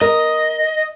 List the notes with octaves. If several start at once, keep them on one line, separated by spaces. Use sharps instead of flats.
A#4 D#5